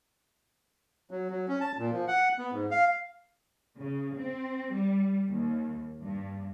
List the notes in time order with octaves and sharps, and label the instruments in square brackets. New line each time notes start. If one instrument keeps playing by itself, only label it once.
[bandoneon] F#3
F#3
C#4
A5
A#2
F3
F#5
B3
G#2
F5
[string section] C#3
C4
G3
D#2
G2